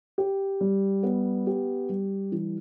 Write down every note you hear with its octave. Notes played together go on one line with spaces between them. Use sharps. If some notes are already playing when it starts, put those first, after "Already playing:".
G4
G3
B3
G4
G3
E3